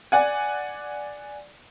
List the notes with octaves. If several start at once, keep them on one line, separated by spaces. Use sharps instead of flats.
D5 F#5 G#5